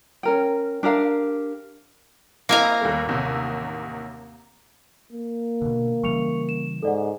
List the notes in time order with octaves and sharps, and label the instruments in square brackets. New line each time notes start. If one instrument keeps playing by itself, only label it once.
[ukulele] C#4 A#4 G5
D4 G4 A#4 F5
[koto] A#3 G#5 A#5 [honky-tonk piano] C4 E4 D#5
[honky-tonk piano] D#2 G3 A3
A1 D#2 C3
[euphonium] A#3
[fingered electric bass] B2 D3
[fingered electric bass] C#3 E3 G3 [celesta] C#6 C#7 F7
[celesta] E7
[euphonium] G#2 [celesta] A4 D5 F#5